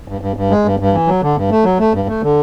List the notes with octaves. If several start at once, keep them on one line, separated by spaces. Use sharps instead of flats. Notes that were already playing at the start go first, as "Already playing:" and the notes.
G2
G2
G2
G#3
G2
G2
E3
F#3
D3
G2
A3
F#3
A3
G2
A3
D3